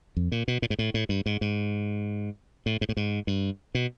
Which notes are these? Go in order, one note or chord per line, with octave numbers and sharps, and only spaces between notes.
F2
A#2
B2
A#2
G#2
A2
A2
G2
G#2
G#2
A2
G#2
A2
G#2
G2
B2